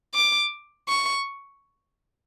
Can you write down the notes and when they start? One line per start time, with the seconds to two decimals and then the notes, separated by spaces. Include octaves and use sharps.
0.15 D6
0.89 C#6